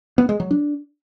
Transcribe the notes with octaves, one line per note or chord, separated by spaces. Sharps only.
B3
G#3
F#3
D4